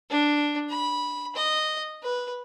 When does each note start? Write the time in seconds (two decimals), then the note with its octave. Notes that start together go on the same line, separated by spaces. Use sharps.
0.10 D4
0.70 B5
1.36 D#5
2.03 B4